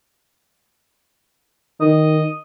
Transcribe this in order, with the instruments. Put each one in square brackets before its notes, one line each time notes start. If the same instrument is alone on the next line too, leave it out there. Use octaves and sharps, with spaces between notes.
[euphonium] D#3 [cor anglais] D#5